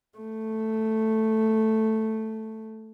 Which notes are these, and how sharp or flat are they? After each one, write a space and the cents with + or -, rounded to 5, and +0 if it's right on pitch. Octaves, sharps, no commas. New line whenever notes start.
A3 +0